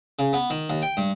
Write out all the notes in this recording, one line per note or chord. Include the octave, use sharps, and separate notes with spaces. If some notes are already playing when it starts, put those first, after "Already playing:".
C#3
B3
D#3
D#2
G5
G2